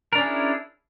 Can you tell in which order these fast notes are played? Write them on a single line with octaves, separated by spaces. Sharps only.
A#4 D4 C#4 G#4 E4